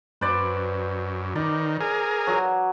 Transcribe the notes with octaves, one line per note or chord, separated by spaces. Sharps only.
F#2 B4 C5 D5
D#3 D5
G#4 A#4
F#3